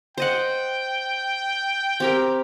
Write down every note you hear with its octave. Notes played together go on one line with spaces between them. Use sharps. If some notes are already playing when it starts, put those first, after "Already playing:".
C5 D#5 F#5 G5
C4 G4 A#4